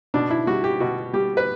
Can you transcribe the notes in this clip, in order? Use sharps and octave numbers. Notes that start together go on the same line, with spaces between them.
B2 D4
E4
G3 F#4
G4
B2 F#4
G3 G4
B4